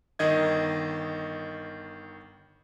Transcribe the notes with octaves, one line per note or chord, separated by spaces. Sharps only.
G1 D#3 D#5 G#6